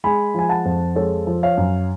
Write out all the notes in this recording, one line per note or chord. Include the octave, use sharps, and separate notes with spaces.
G#3 G#5 B5
F3 G#5
F#5 A5
F2
G#3 A4 C#5
F3
C#5 F5
F#2